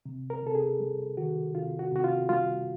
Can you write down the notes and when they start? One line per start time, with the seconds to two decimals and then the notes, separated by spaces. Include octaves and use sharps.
0.06 C3
0.30 A#4
0.43 C3 A4
0.55 G#4
0.80 G3
1.17 D#3 F#4
1.55 C3 F4
1.79 F#4
1.92 C3 F#4
2.04 F4
2.29 G3 F4